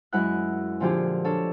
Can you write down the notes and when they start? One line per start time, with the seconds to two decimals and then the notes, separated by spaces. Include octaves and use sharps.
0.13 F#2 G#3 E4 A#4 F#5 F#6
0.80 A#2 D3 F3 F4 G4 G#4
1.25 D4 A4 C#5 F5